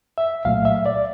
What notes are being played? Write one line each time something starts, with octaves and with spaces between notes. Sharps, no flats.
E5
C2 A#2 F#3 A3 F5
E5
D5